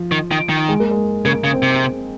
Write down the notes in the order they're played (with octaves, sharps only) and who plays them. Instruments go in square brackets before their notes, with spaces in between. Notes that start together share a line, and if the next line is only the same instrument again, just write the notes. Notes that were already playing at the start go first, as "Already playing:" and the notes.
Already playing: [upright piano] F3
[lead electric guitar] D#3
D#3
D#3
[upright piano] G#3
A#3
G#3
[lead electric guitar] C#3 [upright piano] A#3
[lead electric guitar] C#3
[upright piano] C4
[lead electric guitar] C3